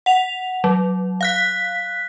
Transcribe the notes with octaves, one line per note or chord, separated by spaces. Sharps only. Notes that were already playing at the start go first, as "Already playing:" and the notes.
F#5 F7
F#3
F5 F#6 B6